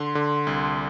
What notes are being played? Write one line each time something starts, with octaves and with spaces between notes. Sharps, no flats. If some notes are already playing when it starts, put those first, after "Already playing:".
Already playing: D3 C6
D3
C2